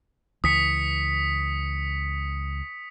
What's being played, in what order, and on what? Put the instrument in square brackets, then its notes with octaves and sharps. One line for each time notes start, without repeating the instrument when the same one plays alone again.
[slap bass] C#2 E3 [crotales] D#6 B6 C#7